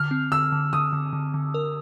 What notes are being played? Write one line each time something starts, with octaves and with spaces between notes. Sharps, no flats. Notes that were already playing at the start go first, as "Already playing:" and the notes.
Already playing: D3 F6
C4
D3 E6
D3
D3 D#6
D3
D3
D3
A#4